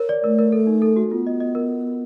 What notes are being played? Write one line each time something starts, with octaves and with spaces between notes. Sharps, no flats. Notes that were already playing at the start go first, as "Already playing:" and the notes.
Already playing: A#4 C#5
D5
A3 A#4
A#4
A4
D#4
A4
F#4
B3 F4
D#5
D#5
A#4